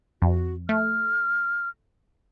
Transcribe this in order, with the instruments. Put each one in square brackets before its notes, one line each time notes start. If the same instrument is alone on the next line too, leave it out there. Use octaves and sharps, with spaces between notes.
[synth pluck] F2 [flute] F#4
[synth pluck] A3 [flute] F6